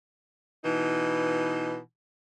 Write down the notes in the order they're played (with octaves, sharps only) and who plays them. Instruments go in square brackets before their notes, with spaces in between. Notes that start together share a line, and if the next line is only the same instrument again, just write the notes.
[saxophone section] B2 E3 D#4